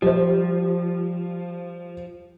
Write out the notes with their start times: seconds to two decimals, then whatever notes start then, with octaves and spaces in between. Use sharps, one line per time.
0.02 F3 G3 C5